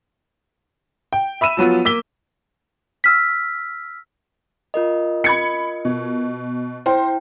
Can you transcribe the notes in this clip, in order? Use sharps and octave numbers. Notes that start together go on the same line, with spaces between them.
G5
E5 B5 E6 D#7 E7
F3 F#3 B3 F4
A#3 E6 B6 G7
E6 F6 B6
F4 A#4 D#5
B5 G#6 C#7
B2
E4 C5 G5